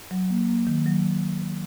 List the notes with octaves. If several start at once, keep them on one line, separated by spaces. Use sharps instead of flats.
F#3
A#3
A#3
D#3
F#3